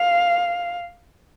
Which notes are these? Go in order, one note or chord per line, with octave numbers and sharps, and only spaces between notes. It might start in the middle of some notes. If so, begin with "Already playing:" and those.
Already playing: F5